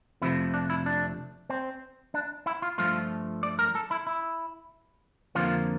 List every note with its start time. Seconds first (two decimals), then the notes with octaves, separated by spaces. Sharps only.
0.22 F2 C3 F3 A3 E4
0.54 D4
0.70 E4
0.86 D4
1.50 C4
2.14 D4
2.46 E4
2.62 F4
2.78 G2 F3 A3 F4
3.43 D5
3.59 A#4
3.75 A4
3.91 E4
4.07 E4
5.35 F2 D3 F3 A#3 F4